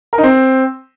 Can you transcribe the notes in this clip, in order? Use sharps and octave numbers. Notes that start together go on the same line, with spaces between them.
A#4
D#4
C4